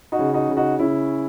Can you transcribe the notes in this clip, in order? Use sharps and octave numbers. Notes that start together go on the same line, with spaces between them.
D#4 F#4
C#3
D#4 F#4
C#3
D#4 F#4
C#3 C#4 E4